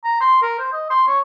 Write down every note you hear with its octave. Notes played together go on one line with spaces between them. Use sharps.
A#5
C6
A#4
C5
D#5
C6
C#5